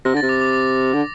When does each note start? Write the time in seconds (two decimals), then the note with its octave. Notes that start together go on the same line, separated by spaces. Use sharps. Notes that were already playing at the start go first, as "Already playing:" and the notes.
0.05 C3 A#6
0.14 D3 A6
0.23 C3
0.29 D6
0.41 D6
0.53 D6
0.94 D3